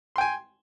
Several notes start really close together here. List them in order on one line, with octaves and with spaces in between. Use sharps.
C6 G5 G#5